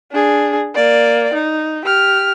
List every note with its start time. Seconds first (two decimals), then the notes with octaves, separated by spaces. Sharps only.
0.12 D4 G#4
0.74 A#3 D5
1.34 D#4
1.85 G4 F6